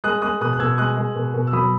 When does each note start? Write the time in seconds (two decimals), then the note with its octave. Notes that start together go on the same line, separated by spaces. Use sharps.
0.04 G#3 D#6 F#6
0.22 G#3 D#6 F#6
0.41 B2 D#6 F#6
0.53 F#6
0.59 B2 E6 G#6
0.78 G#3 D#6 F#6
0.97 G#3
1.16 B2
1.34 B2
1.47 E6
1.52 F#3 B5 D#6